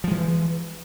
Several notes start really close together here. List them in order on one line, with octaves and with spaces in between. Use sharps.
F3 G#3 E3